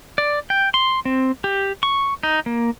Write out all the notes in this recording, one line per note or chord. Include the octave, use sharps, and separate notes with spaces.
D5
G5
C6
C4
G4
C#6
D#4
A#3